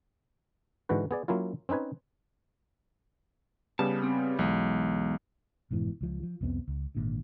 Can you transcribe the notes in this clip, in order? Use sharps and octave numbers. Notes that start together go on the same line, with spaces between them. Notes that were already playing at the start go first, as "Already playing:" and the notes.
G#2 D3 E3 F#4 B4
B3 G#4 D5
F#3 A#3 C#4 E4 F4
C4 C#4 D#4 B4 G#5
C#3 G3 B3 A5
C4
B1 E2 G#3
F1 G#2 B2 E3
C#2 F3
F3
C2 F2 B3 C4
C#2
G#1 A#2 D3